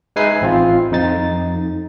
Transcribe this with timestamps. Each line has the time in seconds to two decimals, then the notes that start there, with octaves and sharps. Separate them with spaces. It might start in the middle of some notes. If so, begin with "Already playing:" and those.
0.16 G#3 D#4 B4 E5 G#5 C7
0.41 A1 C4 F4
0.92 F2 D#4 A6